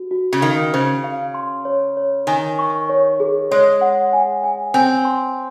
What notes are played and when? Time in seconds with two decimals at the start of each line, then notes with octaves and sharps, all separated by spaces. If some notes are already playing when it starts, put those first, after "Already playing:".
Already playing: F#4
0.11 F#4
0.33 C#3
0.42 D#3 F5
0.73 C#3 C5
1.04 F5
1.34 C6
1.65 C#5
1.97 C#5
2.27 D#3 G#5
2.59 C#6
2.89 C#5
3.20 G#4
3.51 G#3 C#5
3.81 F#5
4.13 G#5
4.44 G#5
4.74 C4 G#5
5.05 C6